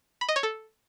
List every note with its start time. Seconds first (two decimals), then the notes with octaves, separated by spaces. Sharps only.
0.21 B5
0.29 D#5
0.36 C#5
0.43 A4